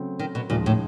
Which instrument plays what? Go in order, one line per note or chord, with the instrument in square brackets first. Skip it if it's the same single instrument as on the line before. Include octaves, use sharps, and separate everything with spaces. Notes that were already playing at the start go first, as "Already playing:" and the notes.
Already playing: [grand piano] C#3 F#3 A3 C4
[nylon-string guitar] D#3
B2
[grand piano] D#2 C#3 F3 G#3 [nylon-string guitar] A#2
[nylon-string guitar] A2